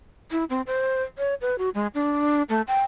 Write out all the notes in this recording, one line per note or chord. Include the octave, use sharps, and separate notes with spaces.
E4
C4
C5
C#5
B4
F#4
G#3
D4
A3
G5